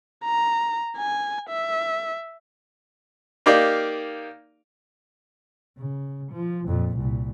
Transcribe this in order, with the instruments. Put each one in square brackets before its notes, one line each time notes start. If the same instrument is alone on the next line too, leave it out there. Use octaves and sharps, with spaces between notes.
[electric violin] A#5
G#5
E5
[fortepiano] A#3 D#4 G4 D5 F5
[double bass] C#3
F3
F2 A#2
C2 A#2